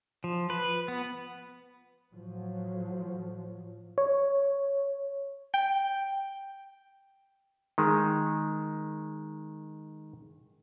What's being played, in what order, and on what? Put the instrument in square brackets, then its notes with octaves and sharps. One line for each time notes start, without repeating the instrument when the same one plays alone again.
[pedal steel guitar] F3
B4
B3
[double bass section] A2 F3 F#3
[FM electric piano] C#5
[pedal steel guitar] G5
[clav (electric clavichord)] D#3 G#3